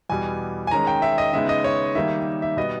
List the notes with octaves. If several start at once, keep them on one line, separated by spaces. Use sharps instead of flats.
E2 B2 G3 G#5
G#5
D#3 G#3 C#4 A#5
G5
E5
D#5
C#3 G#3 B3 D#4 E5
D#5
C#5
D#3 G3 A#3 D#4 E5
E5
B2 G3 B3 D#5